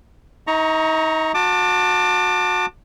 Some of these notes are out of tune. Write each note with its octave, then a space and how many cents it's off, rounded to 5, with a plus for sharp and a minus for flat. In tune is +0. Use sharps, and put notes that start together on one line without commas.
D#4 +35 A#5 +0 C#6 +0
F#4 -20 A5 +15 D6 +20